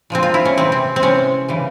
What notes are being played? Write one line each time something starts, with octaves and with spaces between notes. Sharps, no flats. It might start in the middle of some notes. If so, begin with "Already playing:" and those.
A#2 F3 G#3 C4
F4
E4
C#4
C3 E3 G3 C4
C4
C4
C3 E3 G#3 C#4
C#3 E3 G3